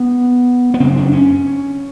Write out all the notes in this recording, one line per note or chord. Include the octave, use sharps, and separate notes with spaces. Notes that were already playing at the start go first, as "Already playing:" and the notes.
Already playing: B3
B3
F#2 C#3 C4
D4
C#4